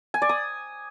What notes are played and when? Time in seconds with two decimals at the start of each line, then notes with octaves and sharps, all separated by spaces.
0.14 G#5
0.22 D5
0.29 D#6